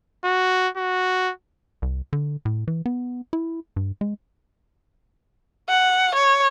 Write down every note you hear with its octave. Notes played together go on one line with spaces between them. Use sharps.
F#4
F#4
C2
D3
A2
E3
B3
E4
G2
G#3
F#5
C#5